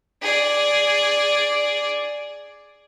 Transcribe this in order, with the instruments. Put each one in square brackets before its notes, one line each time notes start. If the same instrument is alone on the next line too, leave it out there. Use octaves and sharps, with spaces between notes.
[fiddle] G#4 D5